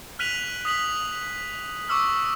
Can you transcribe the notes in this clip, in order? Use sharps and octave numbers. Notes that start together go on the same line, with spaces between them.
F6 F#6 B6 D#7 F7 F#7
D#6 B6 F#7
C#6 D6 E6 F6